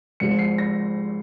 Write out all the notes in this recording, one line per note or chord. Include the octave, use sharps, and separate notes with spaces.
G#1 G#2 F3 G#3 C#7
C7
A#6